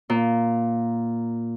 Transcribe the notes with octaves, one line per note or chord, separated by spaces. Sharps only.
A#2